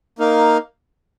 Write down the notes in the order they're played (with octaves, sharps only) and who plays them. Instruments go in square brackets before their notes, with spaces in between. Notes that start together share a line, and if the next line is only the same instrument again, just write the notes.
[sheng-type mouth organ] A#3 D#4 A#4 F5